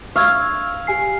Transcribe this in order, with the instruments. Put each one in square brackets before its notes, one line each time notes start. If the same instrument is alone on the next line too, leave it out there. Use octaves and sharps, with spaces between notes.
[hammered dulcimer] F5 [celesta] C#6 E6 G#6
[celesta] G4 G#5 C7